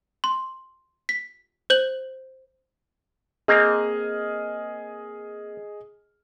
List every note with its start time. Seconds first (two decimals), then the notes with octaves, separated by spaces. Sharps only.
0.24 C6
1.09 B6
1.70 C5 G6 F#7
3.48 A#3 C4 G#4 D#5 F6